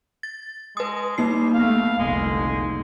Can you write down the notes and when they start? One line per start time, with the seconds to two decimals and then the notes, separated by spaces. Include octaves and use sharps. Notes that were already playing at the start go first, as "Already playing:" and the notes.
0.23 A6
0.77 G#3 B4 D#6
1.18 G3 A#3 D#4 C7
1.54 A3 B3 F5
1.99 F1 C2 D3 G#3